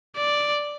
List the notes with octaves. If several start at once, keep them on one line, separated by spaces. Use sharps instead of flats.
D5